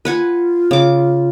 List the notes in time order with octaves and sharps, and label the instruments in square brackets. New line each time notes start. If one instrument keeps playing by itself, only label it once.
[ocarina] F4 [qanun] B4 F#5 G#5
[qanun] C#3 D6